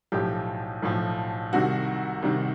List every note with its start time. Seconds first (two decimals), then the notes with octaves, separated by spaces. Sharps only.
0.12 B1 A2 F3 G4
0.82 B1 A2 F3
1.53 C2 C3 D#3 F#4
2.22 C2 C3 D#3